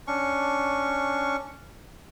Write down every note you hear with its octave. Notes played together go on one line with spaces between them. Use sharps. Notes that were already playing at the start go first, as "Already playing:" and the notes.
C#4 D4 C#6